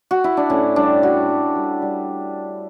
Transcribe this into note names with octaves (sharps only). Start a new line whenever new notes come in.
F#4
E4
D4
A2 C#4
G3 D4
G3 F#4
G3
G3
G3